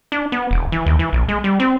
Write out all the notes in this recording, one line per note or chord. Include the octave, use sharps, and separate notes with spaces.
D4
B3
E1
E3
D#2
E3
A#1
G#3
G3
C4